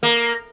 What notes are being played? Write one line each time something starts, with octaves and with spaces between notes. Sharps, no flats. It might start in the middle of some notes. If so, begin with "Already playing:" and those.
A#3